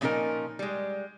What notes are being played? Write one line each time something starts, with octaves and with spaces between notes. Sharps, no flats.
A#2 F3 C#4 D#4 F4 A#4
G3 G#3